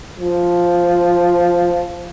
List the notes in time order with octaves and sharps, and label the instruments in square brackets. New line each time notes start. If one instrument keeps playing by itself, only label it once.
[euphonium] F3